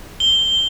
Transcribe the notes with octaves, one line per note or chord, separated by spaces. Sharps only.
G7